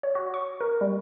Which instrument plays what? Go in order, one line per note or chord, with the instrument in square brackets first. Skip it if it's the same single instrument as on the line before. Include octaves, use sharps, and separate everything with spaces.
[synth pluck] C#5
F#4
C#6
A#4
G3